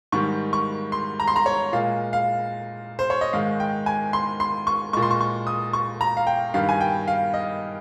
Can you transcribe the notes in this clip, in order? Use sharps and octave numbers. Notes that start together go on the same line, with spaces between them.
G#2 D#3 G3 C#6
C#6
C6
A#5
C6
A#5
C#5
A#2 G#3 F5
F5
C5
C#5
D#5
G#2 D#3 G#3 F5
G5
G#5
C6
C6
C#6
A#2 G#3 C#6
C6
C#6
C#6
D#6
C#6
A#5
F5
G5
G2 D#3 G3 F5
G#5
G5
F5
D#5